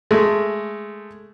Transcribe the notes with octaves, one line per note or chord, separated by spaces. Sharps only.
G#3 A3